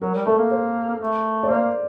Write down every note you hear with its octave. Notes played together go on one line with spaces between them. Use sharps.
F#3 A#4
G3
A3 A4
A#3
C5
A3
D5
A#3 C5